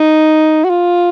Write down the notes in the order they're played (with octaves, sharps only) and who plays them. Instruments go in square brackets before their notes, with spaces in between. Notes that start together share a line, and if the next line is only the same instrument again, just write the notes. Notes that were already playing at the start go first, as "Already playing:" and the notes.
Already playing: [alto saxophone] D#4
F#4
F4